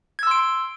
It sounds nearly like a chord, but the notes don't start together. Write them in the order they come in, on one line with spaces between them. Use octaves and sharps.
G#6 E6 C6 D7